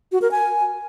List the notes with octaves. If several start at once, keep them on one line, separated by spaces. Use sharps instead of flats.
F#4
A#4
G#5